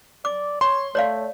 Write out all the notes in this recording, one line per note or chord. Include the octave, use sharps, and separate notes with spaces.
D5 D6
C#5 C6
A3 C#5 D5 F5